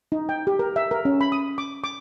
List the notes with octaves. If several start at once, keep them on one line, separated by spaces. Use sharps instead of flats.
D#4
G5
G4
A#4
E5
A#4
C#4
B5
D#6
D6
D6